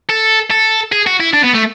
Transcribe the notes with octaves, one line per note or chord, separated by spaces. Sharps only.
A4
A4
G#4
F#4
E4
D4
B3
A3